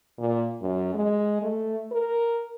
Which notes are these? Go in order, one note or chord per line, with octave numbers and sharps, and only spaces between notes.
A#2
F#2
G#3
A3
A#4